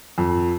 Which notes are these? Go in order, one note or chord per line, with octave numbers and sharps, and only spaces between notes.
F2